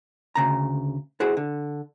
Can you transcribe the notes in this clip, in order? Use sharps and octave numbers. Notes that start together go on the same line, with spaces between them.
D2 C#3 A#5
E4 F#4 G#4 C5
D3